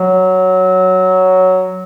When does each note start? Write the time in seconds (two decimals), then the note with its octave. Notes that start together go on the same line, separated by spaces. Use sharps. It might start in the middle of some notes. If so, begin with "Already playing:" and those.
Already playing: F#3